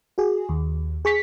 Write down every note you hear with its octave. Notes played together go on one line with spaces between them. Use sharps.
F#4 G#4
D#2
G#4 C#6 B6